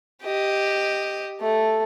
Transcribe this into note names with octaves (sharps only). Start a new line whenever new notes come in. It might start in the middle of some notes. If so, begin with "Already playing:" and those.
G4 D#5
A3